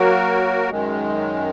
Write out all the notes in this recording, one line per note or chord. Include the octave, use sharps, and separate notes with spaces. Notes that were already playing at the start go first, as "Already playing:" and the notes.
Already playing: F#3 A#3 F#4 A#4
F#2 D#3 G#3